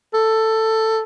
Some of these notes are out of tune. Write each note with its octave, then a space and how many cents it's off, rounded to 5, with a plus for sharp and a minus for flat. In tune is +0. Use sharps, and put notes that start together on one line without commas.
A4 +10